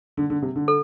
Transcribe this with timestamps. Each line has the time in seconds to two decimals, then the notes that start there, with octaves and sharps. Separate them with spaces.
0.17 D3
0.30 D3
0.42 C3
0.56 D3
0.68 A4